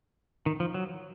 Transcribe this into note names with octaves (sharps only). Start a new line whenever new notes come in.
D#3
F3
F#3